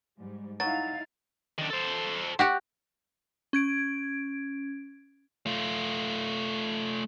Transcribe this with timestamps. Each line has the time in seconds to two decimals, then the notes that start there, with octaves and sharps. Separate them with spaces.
0.19 G#2 G3
0.60 F#3 D#4 E4 F5 A6
1.59 D#3 D4
1.70 A4 C5
2.39 F#4 G4 F#5
3.53 C#4 G#6 D7
5.46 A3 F4